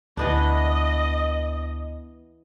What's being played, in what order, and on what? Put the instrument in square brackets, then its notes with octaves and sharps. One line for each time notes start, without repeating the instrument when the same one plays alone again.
[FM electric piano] D2 [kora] E3 B3 D4 [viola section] D#5